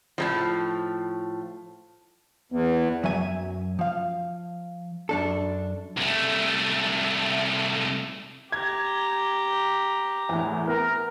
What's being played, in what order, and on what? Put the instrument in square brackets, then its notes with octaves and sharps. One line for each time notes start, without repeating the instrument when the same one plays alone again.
[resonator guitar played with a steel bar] A2 C3 F3
[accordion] E2 [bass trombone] B3
[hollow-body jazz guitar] F#2 F#3 E5 G#5
F3 F5
F#2 D4 A4
[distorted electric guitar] C2 A3
[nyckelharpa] G4 A#5 [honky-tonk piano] G#6
[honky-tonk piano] E2 A2
[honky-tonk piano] B3 [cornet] A#4